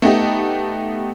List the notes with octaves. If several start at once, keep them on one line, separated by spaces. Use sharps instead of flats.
A3 B3 D#4 G4